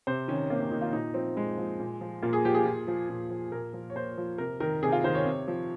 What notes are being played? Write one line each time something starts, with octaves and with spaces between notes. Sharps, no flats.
C3 C5
D#3 C#4
C3 A#3
C#4
D#3 D#4
F4
A#2 D#4
F3 C4
A#2 G#3
F3
A#2
F3
A#2 A#3
G#4
F3 G4
G#4
A#2
F3
A#2
F3
A#2 A#4
F3
C#5
A#2 C5
F3
C3 A#4
D#3 A#4
C3 G#4
F4
D#3 C5
C#5
C3
F3